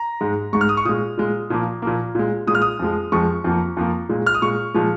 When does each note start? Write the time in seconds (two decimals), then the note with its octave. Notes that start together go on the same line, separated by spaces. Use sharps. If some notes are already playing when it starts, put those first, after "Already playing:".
Already playing: A#5
0.21 G#2 G#3
0.53 G#2 G#3 C#6
0.61 F6
0.69 D#6
0.77 C#6
0.85 A#2 G#3 D#6
1.17 A#2 G#3
1.50 A#2 F3 A#3
1.82 A#2 F3 A#3
2.15 A#2 G#3
2.47 A#2 G#3 D#6
2.55 F6
2.62 D#6
2.79 F2 F3 G#3
3.12 F2 F3 G#3 C#6
3.44 F2 F3 A#3
3.77 F2 F3 A#3
4.09 A#2 G#3
4.26 F6
4.35 D#6
4.42 A#2 G#3 C#6
4.74 A#2 F3 G#3